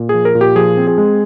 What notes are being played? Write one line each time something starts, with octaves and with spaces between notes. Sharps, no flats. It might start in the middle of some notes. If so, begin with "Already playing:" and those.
Already playing: A#2
F3 G#4
A#4
A#2
G4
F3 G#4
C4
G#4
G#3